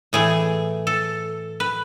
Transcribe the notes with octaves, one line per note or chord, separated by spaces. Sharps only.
A2 E3 A3 G#4
A4
B4